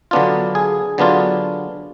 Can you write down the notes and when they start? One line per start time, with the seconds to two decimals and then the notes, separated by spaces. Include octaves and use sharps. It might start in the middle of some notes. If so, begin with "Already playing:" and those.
0.11 D3 F#3 B3 D4 F4
0.55 G#4
0.98 D3 F#3 B3 D4 F4